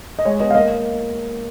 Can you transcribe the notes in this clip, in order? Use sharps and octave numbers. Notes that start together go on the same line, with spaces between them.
D#5
G#3 C#5
B3 D#5
F5
A#3 D#5